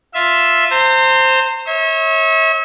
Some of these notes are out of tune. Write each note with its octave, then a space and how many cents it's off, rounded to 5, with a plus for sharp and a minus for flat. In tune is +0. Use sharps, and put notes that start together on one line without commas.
F4 +0 E5 +0
C5 +0 A#5 -40
C#5 -25 E5 -40